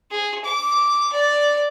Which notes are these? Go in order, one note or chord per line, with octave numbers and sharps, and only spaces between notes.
G#4
D6
D5